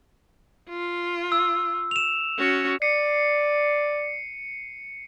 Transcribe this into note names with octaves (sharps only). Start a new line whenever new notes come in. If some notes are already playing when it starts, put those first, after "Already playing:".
F4
E6
E7 F7
C#4 F#4
D5 C7 C#7 D#7